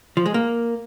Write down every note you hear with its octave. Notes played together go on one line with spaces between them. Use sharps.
F3
G#3
A#3